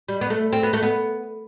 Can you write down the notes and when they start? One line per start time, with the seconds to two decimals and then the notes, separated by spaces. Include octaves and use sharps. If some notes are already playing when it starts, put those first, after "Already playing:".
0.08 G3
0.21 B3
0.30 A3
0.53 C4
0.63 B3
0.73 A3
0.83 B3